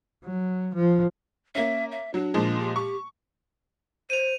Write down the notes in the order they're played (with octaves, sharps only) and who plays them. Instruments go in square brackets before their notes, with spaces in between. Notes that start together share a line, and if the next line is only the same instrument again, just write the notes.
[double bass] F#3
F3
[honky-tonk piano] A#3 C#4 [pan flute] E5
[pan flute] E5
[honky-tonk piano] F#3 [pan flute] D4
[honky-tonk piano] A#2 F3 G#3
[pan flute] G4
[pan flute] G4 [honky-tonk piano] C#6
[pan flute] C5 [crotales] D#7 F7